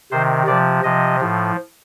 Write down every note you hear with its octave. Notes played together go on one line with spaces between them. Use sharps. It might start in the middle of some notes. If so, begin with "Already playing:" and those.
C3 D#3 C5
C3 F3 D5
C3 F3 D#5
A2 F3